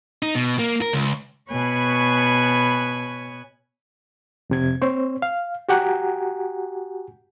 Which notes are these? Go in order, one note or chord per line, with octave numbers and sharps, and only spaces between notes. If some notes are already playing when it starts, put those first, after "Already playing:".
D#4
B2
A#3
A#4
C#2
B2 B3 C#5 G#5 B5 F#6
F2 C3 G#6
C4 C5 C#5
F5
F#4 G4 F#5 G#5 A#5